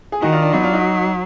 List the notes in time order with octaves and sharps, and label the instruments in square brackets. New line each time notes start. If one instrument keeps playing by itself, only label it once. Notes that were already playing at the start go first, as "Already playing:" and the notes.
[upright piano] G#4
[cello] D#3 [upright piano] D#4 F#4
[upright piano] D4 F4
D4 F4
[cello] F#3 [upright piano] B3 D#4
[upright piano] D4 F4
D#4 F#4